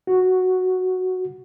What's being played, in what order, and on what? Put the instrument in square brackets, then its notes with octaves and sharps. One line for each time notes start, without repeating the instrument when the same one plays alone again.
[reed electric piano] F#4